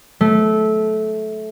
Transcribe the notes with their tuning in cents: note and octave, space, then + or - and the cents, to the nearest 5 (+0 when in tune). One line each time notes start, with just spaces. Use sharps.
A3 -20